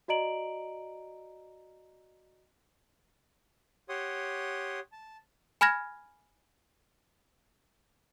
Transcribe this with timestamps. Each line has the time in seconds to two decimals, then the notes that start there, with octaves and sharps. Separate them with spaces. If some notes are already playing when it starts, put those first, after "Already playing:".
0.08 F#4 D5 D#5 A#5 D7 F#7
3.89 G4 C#5 F#5 C6 D#6
4.92 A5
5.61 G#5 B5 F6 G#6 A#6